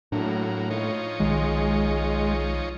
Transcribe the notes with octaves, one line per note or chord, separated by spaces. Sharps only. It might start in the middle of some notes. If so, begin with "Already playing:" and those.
A2 F#3 A#3 D4
F3 D#4 C#5
B1 D#3 G#3